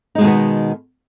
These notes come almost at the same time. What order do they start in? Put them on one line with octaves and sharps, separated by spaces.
D#4 G#3 B2 D#3 B3